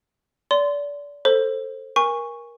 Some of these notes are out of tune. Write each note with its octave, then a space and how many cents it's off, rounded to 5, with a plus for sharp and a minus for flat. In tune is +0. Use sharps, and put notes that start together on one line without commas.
D5 -30 C6 -20
A4 +15 C5 +15
A#4 +20 G#5 -20 C#6 +0